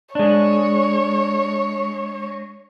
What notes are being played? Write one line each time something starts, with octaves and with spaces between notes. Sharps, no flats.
G#3 D4 C#5